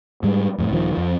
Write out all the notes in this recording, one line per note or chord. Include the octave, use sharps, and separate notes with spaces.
G#2 G3 G#3
F2 A2
D#1 D#3 F3
F2 F3